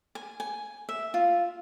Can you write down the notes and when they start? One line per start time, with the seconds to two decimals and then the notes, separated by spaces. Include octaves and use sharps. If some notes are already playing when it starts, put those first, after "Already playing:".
0.15 G#5
0.40 G#5
0.89 E5
1.14 F4